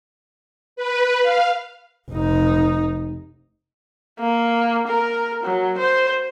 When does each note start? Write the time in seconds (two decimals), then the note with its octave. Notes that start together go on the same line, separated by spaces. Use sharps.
0.76 B4
1.22 F5
2.10 F1 D#4
4.20 A#3
4.87 A#4
5.44 F#3
5.78 C5